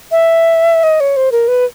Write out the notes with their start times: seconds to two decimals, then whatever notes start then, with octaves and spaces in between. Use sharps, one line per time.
0.11 E5
0.83 D#5
1.00 C#5
1.17 C5
1.32 A#4
1.48 B4